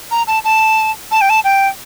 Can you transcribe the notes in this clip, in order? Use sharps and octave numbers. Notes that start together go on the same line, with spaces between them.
A#5
A5
A5
A5
G5
A5
G5